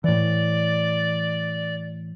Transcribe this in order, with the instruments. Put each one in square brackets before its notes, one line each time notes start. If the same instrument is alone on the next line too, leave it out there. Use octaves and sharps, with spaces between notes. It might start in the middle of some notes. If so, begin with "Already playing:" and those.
[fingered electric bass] A2 E3 [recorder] D5